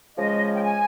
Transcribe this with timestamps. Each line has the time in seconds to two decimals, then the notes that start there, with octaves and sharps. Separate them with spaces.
0.16 C#3 F3 G#3 D#5
0.55 G5
0.62 G#5